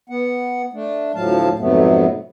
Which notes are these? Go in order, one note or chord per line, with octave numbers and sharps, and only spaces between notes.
B3 F#5
A3 D4
D2 A2 F3 F#3 F5 A5
F2 G#2 C3 F#3 A3 B3